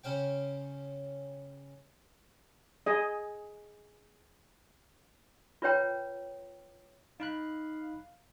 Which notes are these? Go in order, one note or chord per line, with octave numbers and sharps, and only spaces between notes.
C#3 C#4 C5 G5
G#4 D#5
F4 B4 C#5 G5 A#5
D#4 F5 B5 F#6